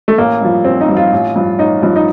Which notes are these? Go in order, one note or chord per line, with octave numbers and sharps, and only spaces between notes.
A3
A1 A#3
G2 F3
A1 C4
D#4
G2 F3
F4
A1
G2 F3
A1 D#4
G2 F3
D#4